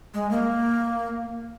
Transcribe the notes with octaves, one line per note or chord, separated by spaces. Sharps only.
G#3
A#3